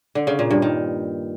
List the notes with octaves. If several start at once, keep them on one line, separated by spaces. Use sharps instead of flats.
D3
C#3
A#2
G2
D#3